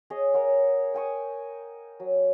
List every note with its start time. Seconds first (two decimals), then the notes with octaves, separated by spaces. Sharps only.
0.10 G#4 C#5 D#5
0.34 A#4 C#5 F#5
0.94 G5 G#5 C#6 D#6
2.00 F#3